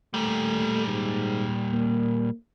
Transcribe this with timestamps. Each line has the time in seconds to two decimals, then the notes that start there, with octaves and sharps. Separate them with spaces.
0.14 A#2 G3 A3
0.87 G#2
1.73 A#3